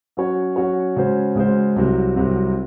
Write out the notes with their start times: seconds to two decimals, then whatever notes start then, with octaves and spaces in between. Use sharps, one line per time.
0.17 F#3 C#4 F#4 C#5
0.56 F#3 C#4 F#4 C#5
0.97 C#3 G#3 C#4 F#4 C5
1.36 C#3 G#3 C#4 F#4 C5
1.76 C2 C3 F#3 C4
2.16 C2 C3 F#3 C4